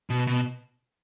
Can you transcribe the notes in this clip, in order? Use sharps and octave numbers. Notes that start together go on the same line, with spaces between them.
B2
B2